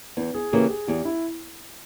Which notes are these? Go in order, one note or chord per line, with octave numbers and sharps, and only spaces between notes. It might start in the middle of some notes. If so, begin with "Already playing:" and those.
E2 B3
G#4
C#3 E3 A#3 G4
G#4
E2 G4
E4